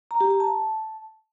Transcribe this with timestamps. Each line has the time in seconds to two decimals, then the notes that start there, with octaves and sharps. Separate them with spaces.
0.11 A#5
0.21 G4
0.30 A#5
0.40 A5